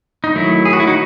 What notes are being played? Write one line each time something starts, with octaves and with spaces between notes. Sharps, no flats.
D#4
D#3 F#3 A3 E4
G#4
F#4
E4
D#4 F#4